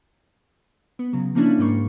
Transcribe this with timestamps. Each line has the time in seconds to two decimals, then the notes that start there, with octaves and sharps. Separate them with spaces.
0.99 B3
1.13 C#3 F#3
1.35 F3 A#3 C#4 D4 E4
1.59 G#2 G3 A#3 C#6